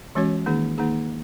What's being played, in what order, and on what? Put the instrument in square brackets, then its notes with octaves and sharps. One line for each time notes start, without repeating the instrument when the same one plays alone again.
[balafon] E3 G#3 C#4 F#4 C#5
D#3 A#3 D#4 G#4
D#3 A#3 D#4 G#4